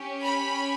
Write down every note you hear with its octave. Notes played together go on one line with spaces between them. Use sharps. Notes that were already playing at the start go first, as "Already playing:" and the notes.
Already playing: C#4 G4
B5